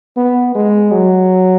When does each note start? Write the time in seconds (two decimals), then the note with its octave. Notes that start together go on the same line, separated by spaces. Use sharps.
0.17 B3
0.55 G#3
0.92 F#3